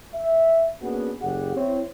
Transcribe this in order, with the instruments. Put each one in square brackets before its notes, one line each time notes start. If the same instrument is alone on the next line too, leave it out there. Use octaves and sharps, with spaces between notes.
[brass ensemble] E5
A#3 B3 C#4 D4 F#4 G#4
F#1 G4 G#4 F#5
C4 E4 C#5